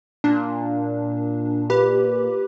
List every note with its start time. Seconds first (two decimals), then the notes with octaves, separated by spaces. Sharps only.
0.24 A#2 D4
1.70 G4 B4